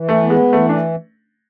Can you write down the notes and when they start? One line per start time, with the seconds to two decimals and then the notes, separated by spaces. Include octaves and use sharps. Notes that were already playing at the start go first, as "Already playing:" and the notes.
Already playing: E3
0.09 A3
0.23 B3
0.30 G#3
0.52 E3 A3
0.69 D4